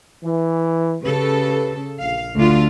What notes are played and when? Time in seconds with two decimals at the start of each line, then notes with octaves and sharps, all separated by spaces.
0.23 E3
1.03 C#3 G4 A4 B4
2.01 A#1 F5
2.35 D2 D3 F4